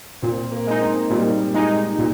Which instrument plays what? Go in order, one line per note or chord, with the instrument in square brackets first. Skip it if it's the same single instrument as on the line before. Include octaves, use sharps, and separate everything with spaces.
[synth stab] A#2 [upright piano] C4
[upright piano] A#3
[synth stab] G#3 D#4
[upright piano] C4
[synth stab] A#2 [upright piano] G3
[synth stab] G#3 D#4
A#2